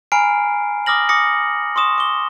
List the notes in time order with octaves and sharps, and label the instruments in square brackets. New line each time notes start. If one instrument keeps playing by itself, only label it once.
[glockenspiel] G#5 A#5 B5 F6 C7 D7
D6 D#6 F6 A#6 F#7
D6 D#6 A#6 C#7
C6 C#6 D#6 E7
D6 G7